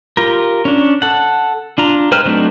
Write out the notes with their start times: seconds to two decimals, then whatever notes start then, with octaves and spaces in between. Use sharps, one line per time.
0.17 F4 G4 A#4
0.65 C#4 D4
1.02 A4 F#5
1.78 D4 F4 A#5
2.12 G#3 B4 C5 G5 F6
2.25 F#3 A3 C4 D4 D#4